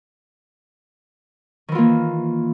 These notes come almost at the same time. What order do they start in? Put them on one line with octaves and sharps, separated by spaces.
D#3 E3 F4 A#3